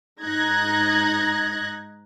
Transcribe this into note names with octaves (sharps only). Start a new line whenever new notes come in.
G#2 D#4 F#6 G#6 A#6